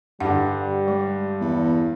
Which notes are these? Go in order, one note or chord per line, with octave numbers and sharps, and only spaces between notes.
G2 D3 G3 F#5
G#3
E2